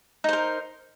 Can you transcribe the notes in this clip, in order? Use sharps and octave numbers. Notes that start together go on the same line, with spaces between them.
D#4 A#4 C5